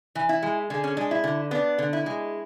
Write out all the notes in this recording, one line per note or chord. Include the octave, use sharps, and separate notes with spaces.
E3
E4
G#3
D3 G#4
C#4
G#3 D4
E4
D3
B3 D4
D3
E4
G#3